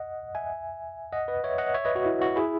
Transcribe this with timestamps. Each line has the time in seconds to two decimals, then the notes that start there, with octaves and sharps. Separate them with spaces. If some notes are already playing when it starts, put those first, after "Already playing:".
Already playing: D#5 F#5
0.35 E5 G#5
1.12 D#5 F#5
1.28 B4 D#5
1.44 C#5 E5
1.58 D#5 F#5
1.74 C#5 E5
1.85 B4 D#5
1.96 F#4
2.06 E4
2.21 F#4
2.36 E4 G#4